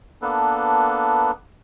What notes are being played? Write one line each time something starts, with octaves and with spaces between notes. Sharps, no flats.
A#3 B3 D4 A4 B4